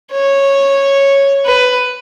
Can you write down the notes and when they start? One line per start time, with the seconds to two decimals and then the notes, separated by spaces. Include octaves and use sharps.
0.12 C#5
1.45 B4